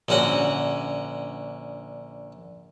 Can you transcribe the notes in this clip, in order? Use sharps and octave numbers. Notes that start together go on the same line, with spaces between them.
A#1 D3 C#4 F#4 F#5